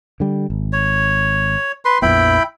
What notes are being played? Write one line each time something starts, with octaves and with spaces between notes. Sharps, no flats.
D3 G3
G#1
C#5
B4 C6
A#1 F2 B3 E4 G5 B5